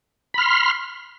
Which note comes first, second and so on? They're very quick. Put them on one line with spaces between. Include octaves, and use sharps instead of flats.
B5 F6 C6